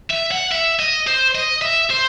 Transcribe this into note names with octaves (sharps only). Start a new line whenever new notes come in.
E5
F#5
E5
D#5
C5
D#5
E5
C5